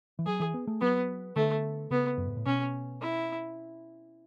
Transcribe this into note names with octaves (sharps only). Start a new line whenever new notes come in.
E3
F#3 G#4
E3
B3
A3
F#3 B3
D3 A3
C#3 B3
F#2
G#2
A2
B2 C#4
E4